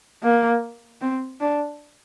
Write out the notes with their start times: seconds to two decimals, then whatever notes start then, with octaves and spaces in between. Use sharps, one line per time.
0.23 A#3
1.01 C4
1.40 D4